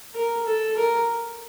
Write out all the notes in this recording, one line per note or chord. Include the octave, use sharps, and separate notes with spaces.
A#4
A4
A#4